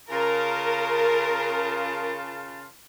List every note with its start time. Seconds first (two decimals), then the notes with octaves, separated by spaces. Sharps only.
0.10 C#3 F4 A#4 A5